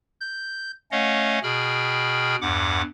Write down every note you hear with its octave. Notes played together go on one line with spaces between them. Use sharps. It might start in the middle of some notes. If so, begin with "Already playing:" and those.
G6
A3 C#4 C#5 D#5 F5 F#5
B2 G#4 G5 B5 F6
E2 G2 F#5 D6